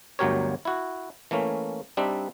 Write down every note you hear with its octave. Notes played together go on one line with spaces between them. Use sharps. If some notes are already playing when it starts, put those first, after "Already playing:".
G1 D2 F#3 G4 A#4 C#5
E4 F#4
E3 A3 A#3 C#4
G3 C4 D4 D#4 E5